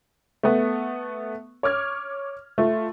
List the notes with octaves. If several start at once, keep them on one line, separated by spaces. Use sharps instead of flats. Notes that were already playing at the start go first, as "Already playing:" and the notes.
A3 B3
C#5 D6 F6 G#6
A3 F4